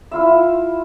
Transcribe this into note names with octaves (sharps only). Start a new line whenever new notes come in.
E4 F4 E5